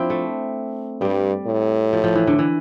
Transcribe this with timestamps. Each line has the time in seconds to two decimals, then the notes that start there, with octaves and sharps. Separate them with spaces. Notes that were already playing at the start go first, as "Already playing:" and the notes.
Already playing: F3 C4 D4 E4
0.10 A3
1.01 G2 G3
1.46 A2
1.93 F3
2.04 F3
2.15 E3
2.27 D3
2.39 E3